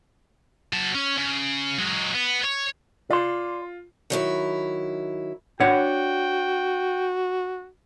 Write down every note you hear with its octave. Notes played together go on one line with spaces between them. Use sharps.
F#3 A5
C#4
C#3
F#3 G#3
B3
C#5
F4 D5 C6
D#3 F#3 E4
D4 F#4 C#5 F#5 G5